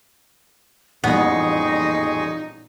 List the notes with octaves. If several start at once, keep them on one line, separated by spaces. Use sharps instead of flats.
A1 F2 A#2 G3 B3 D#4 G#4 C#6